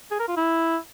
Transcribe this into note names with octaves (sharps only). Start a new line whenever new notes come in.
G#4
A#4
F4
E4